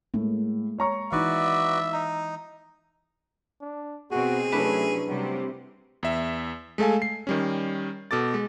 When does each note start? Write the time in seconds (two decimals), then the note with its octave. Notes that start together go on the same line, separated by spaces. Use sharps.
0.14 A2 G#3 A#3
0.78 C#5 A#5 C#6
1.12 E3 D#4 E4 F#4 B4 D5 E5
1.93 D#4
3.61 D4
4.11 B2 C4 F#4 G#4
4.52 C3 F#3 A3 C#4 D4 E4 B4
5.08 C3 F#3 G3 A3
6.03 E2 E5
6.78 G#3 A3 A4 F5 G#5
7.02 C7
7.27 D#3 G3 C#4
8.11 B2 A4 D6 A6
8.34 G#3